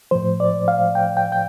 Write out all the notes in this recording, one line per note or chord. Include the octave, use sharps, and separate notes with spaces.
A2 F3 C5
D5
F5
G5
G5
G5